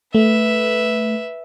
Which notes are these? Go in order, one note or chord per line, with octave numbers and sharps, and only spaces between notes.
A3 B4 E5